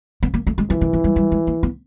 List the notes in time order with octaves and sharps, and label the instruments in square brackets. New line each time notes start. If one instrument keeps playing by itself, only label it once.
[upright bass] B3
A#3
A3
G#3
[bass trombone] E3 [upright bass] F3
[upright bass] D#3
F3
G3
G3
G#3
A#3
B3